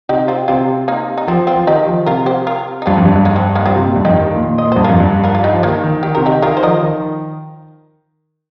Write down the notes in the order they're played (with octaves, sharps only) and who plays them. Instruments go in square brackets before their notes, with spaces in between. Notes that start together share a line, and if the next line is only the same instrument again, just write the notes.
[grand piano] C3 [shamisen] D#4 G4
[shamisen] C4 F4
[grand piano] C3 [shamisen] C4 F4
[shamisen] A#3 D#4
D#4
[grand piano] F3 [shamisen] C4
[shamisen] C4 F4
[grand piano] F3
[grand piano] D#3 [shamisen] D#4 G4
[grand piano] F3
[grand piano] C3 [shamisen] F4 A#4
[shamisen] G4 C5
F4 A#4
D#4
[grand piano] G2 [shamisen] C4 F4
[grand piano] F2
G2
G2
[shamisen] A#3 D#4
C4
A#3 D#4
[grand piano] G2 [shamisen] C4 F4
[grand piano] C3
A#2
G2
[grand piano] F2 [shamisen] D#4 G4
[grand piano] D#3
D#3
A#2
A#2
[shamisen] D#5
[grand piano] A#2
[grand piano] G2 [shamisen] C5
[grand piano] F2 [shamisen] F4 A#4
[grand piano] G2
[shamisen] F4 A#4
F4
D#4 G4
[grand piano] F3
[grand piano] D#3 [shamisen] A#3 D#4
[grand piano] D#3
[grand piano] D#3 [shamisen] G4
[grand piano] C3 [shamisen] A#4
[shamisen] D#4 G4
[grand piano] D#3 [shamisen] F4 A#4
[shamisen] C5
[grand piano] F3 [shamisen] A#4 D#5
[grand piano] D#3